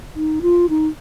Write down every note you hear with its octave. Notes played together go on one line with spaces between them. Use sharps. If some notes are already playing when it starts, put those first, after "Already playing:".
D#4
F4
D#4